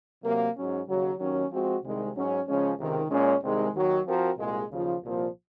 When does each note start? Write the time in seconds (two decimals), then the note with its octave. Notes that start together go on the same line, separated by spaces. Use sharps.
0.23 C3 F#3 A#3
0.56 G#2 F#3 C#4
0.88 D#2 C#3 F#3
1.19 D#2 D#3 F#3 C#4
1.51 F3 G#3 C4 F#4
1.83 C2 C3 D#3 G#3
2.15 G#2 F#3 C#4
2.47 C#3 F3 G#3 C#4
2.78 C#2 C3 D#3
3.10 A#2 G#3 C#4
3.43 C2 C3 D#3 G#3
3.74 D#2 D#3 F#3
4.06 F3 C4 F#4 A#4
4.38 C2 A#2 G#3
4.70 D#2 C#3 F3
5.02 C2 A#2 F3 A#3